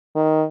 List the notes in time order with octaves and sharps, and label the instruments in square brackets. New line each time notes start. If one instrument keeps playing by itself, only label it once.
[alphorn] D#3